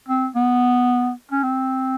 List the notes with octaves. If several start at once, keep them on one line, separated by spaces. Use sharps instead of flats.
C4
B3
C#4
C4